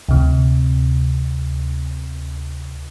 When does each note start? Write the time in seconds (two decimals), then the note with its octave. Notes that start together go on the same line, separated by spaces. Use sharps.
0.09 D2 C3